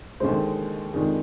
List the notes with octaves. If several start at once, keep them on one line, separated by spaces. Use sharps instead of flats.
D#2 D3 G#3 C5
F2 D#3 G#3 D4